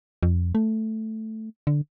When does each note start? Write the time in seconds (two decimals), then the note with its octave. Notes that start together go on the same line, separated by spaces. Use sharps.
0.23 F2
0.55 A3
1.67 D3